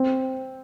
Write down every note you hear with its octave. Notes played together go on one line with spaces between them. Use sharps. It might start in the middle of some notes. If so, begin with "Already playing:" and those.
Already playing: C4